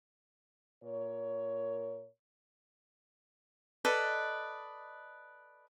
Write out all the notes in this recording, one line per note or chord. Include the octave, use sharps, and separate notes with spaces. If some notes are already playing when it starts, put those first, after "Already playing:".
A#2 A#4 C#5
A4 B4 D5 D#5